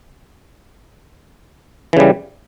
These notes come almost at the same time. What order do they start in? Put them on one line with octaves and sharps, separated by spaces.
E3 C#3 G3